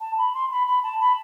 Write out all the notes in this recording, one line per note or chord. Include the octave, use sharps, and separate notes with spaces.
A5
B5
C6
B5
B5
A5
B5